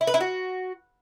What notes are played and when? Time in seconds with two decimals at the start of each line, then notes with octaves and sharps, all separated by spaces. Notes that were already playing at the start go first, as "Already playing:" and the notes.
0.01 E4
0.07 B4
0.14 E4
0.21 F#4